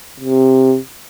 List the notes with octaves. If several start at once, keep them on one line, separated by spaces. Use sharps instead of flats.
C3